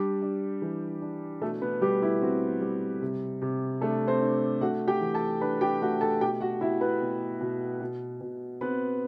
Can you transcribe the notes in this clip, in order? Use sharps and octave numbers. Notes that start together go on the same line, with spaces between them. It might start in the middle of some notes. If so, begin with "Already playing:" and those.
Already playing: G3 D4 G4
D4
E3
D4
B2 A3 A4
B3 B4
B2 G3 G4
E4
C4 F#4
G3
C3
C3
A3 D4 A4
C4 C5
D4
A3 F#4 F#5
G4 G5
E3
A4 A5
D4 B4 B5
G4 G5
A3 F#4 F#5
A4 A5
B2 G4 G5
F#4 F#5
B2 E4 E5
B3 B4
B2
B2
B2
B2
B3 C4 B4